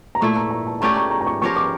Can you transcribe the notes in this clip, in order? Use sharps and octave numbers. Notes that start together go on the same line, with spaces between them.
A#5
A#2 A3 E4 C#6
A#5
A#5
A5
A3 C#4 G4 D5 A#5
A#5
A#5
A#5
C#6
F3 C#4 G4 A#4 C#6
D6